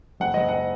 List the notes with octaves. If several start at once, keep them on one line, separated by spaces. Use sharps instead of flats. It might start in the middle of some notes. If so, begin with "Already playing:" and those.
F#1 F#5
F#1 D#5
F#5